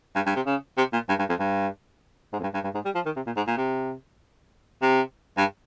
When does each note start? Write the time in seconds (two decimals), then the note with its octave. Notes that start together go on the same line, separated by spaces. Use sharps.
0.15 G2
0.26 G2
0.36 C3
0.46 C#3
0.78 C3
0.93 A#2
1.09 G2
1.19 G2
1.29 F2
1.39 G2
2.33 G#2
2.39 F2
2.43 G2
2.54 G2
2.64 G2
2.74 G#2
2.85 G3
2.95 F3
3.05 D#3
3.16 C3
3.26 A#2
3.36 G#2
3.47 A#2
3.57 C3
4.82 C3
5.37 G2